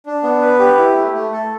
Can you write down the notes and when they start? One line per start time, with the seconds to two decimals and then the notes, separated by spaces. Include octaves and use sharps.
0.06 D4
0.23 B3
0.41 B4
0.59 G4
0.78 E4
0.96 A3
1.14 A3
1.32 A4